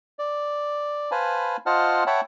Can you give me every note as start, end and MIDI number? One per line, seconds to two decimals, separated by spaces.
0.19 1.11 74
1.11 1.57 71
1.11 1.57 72
1.11 1.57 77
1.11 1.57 80
1.11 1.57 81
1.11 1.57 83
1.66 2.04 65
1.66 2.04 72
1.66 2.04 75
1.66 2.04 78
1.66 2.04 81
1.66 2.04 89
2.07 2.21 73
2.07 2.21 76
2.07 2.21 78
2.07 2.21 79
2.07 2.21 81
2.07 2.21 83